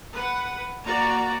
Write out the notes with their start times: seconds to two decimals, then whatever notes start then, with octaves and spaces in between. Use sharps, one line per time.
0.13 B4 F#5
0.85 A#3 F#4 D5 A#5